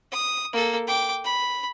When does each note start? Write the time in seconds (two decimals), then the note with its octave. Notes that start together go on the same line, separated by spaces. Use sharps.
0.12 D#6
0.53 A#3 A4
0.87 G5 D6
1.24 B5